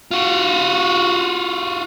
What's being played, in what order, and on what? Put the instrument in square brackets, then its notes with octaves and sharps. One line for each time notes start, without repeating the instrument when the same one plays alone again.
[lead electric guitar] F4 F#4